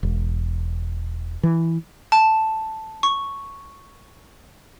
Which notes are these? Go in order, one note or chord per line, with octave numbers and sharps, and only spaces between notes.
E1
E3
A5
C#6